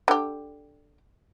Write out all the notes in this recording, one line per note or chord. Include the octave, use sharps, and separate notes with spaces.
D3 G4